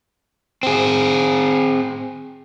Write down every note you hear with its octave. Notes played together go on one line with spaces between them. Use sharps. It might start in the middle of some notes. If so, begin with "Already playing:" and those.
C4 G#4